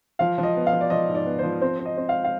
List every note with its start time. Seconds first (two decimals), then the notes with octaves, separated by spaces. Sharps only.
0.19 F3 F5
0.38 F3
0.43 D#5
0.56 B3
0.67 F5
0.73 F3
0.81 D5
0.90 F3 D#5
1.09 G#2
1.15 D5
1.26 B3
1.39 F3 C5
1.61 C4 C5
1.79 C4
1.85 D#5
1.97 C4
2.09 F5
2.24 F5